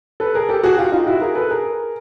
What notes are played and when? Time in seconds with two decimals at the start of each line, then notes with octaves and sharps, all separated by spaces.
0.20 A4 B4
0.35 G#4 A#4
0.49 G4 A4
0.63 F#4 G#4
0.78 F4 G4
0.92 D#4 F4
1.06 E4 F#4
1.21 G#4 A#4
1.35 A4 B4
1.50 G#4 A#4